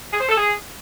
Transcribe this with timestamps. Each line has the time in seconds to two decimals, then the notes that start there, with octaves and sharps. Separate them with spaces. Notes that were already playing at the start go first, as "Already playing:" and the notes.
0.12 G#4
0.20 C5
0.29 A4
0.38 G#4